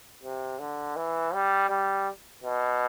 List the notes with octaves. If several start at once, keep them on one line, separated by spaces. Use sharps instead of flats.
C3
D3
E3
G3
G3
B2